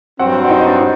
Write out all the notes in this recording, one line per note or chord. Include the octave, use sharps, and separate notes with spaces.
G2 F#3 C4 F#4 F#5
D5
D#4 D#5
D#5
D4 D5
D#4